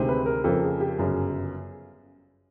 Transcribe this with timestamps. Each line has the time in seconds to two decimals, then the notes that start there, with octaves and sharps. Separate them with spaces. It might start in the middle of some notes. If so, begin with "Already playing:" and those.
Already playing: D2 C3 D#3 G#3 C4
0.09 B4
0.26 A#4
0.44 F2 C#3 F3 A#3 A4
0.62 G#4
0.80 G4
0.98 G1 F#2 C#3 G#4